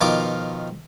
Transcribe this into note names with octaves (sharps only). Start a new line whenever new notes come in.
B2 D#3 F3 F4 F5 D6